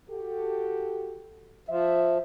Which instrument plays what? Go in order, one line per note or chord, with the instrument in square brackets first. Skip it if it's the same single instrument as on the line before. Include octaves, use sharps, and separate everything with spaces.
[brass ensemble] F#4 G4 A4
[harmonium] F3 [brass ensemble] E5